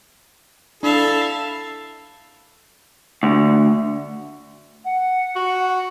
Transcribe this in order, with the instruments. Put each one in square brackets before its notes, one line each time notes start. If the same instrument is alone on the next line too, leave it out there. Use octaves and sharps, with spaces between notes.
[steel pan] D4 [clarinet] E4 [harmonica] A4 [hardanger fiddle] E5 F5
[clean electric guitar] D2
[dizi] F#5
[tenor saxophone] F#4